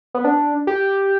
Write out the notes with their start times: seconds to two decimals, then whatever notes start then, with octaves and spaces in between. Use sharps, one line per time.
0.14 B3
0.24 D4
0.67 G4